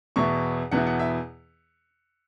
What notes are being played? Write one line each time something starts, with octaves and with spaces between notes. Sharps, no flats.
E2 B2 B3 E4 C#6
E2 B2 B3 E4 F#5
F#5
E5